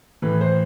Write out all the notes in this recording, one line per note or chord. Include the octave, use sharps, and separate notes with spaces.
A2 E3 B4
C5